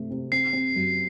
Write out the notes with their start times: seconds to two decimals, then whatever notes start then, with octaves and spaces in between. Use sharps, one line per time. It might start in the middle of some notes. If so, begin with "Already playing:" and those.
Already playing: C3 A3
0.10 C3
0.32 C4 C7
0.53 C4
0.76 F#2